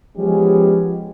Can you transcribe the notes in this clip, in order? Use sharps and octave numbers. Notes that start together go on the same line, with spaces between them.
F3 G#3 B3 C#4 G4